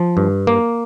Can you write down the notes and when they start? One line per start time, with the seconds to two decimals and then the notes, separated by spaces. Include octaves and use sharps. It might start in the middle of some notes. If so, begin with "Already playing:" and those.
Already playing: F3
0.17 G2
0.47 A#3